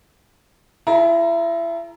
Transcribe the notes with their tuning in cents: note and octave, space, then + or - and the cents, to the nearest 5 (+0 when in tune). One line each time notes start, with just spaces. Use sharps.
E4 +30 A4 -40 A#5 +0